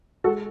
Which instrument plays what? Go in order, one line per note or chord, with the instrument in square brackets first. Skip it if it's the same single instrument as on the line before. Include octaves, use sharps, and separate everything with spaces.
[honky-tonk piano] G#3 F#4 A4